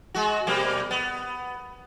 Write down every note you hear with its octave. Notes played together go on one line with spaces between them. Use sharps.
G#3 F#4
B2 G3 A#3
B3